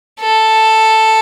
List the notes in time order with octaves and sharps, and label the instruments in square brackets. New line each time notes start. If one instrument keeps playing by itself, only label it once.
[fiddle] A4